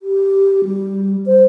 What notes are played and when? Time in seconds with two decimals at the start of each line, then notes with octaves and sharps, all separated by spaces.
0.02 G4
0.65 G3
1.26 C5